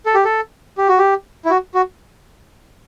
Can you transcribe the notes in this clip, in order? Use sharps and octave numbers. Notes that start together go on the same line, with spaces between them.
A4
G4
A4
G4
F#4
G4
E4
F#4
F#4